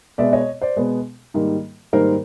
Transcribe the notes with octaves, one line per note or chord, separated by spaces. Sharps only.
B2 G#3 B3 D5 E5
C#5 D#5
C5 D5
B2 G#3 B3
G#2 D#3 G3 A#3
G#2 D#3 G3 A#3 A#4 C5